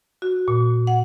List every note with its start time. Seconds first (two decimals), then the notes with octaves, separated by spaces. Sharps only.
0.22 F#4
0.48 A#2
0.87 F#5